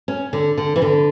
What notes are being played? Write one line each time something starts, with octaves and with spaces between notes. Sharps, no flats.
C#4
D3
D3
E3
D3